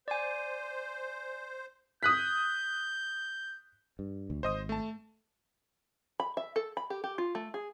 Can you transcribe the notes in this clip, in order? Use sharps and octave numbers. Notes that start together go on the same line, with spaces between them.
C5 D5 G#5
D#6 F#6 G6 B6
G2
D2
G#1 C5 D#5 D#6
A3 A5
B5
E5
A4
B5
G4
G4
F4
A3
G#4